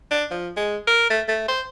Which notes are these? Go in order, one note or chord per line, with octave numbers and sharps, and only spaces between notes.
D4
F3
G#3
A#4
A3
A3
C5